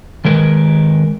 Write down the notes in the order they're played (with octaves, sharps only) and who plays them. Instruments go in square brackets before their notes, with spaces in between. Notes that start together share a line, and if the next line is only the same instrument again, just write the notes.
[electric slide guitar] D#3 G#3 A#4 B4